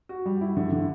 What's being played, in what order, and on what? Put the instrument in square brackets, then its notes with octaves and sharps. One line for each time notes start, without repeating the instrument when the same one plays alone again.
[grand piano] F#4
G3
E4
D3
D3